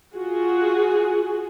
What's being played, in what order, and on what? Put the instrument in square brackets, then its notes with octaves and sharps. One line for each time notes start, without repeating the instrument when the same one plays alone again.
[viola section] F4 F#4 G#4